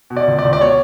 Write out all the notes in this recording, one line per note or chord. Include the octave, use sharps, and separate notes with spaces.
B2
D5
C#2
D5
C#2
D5
B2 C#5